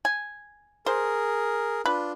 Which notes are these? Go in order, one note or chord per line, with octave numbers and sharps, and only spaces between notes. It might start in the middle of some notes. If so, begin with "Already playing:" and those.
G#5
G#4 A#4 C5
D4 F4 B4